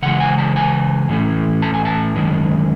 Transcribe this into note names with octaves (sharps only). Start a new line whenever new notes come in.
C#3 E3 G#3 F#5
G#5
A5
G#5
A2 E3 A3 C#4
A5
G#5
A5
F#2 D#3 G#3 C#4